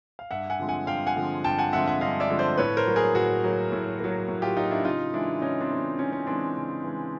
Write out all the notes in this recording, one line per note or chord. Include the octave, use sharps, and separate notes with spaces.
F5
G2 E5 F#5
F#5 G#5
D3 F3 G#3 C4
F#5 G#5
G2 F5 G5
F#5 G#5
D3 F3 G#3 C4
G2 G5 A5
F#5 G#5
D3 F3 G#3 C4 E5 F#5
E5 F#5
G2 D#5 F5
D5 E5
D3 F3 G#3 C4
C5 D5
A2 B4 C#5
A#4 C5
F#3 A#3
G#4 A#4
A2 F#4 G#4
F#3 A#3
A2
F#3 A#3
A2
F4 G4
F#3 A#3 D#4 F4
D4 E4
C#3 D#4 F4
E3 G#3 D4 E4
C#3 C#4 D#4
C4 D4
E3 G#3
C#3 C#4
C#4
E3 G#3 C4 D4
C#3
E3 G#3